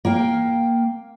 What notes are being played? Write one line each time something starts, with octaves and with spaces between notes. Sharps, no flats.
A#3 F5 G5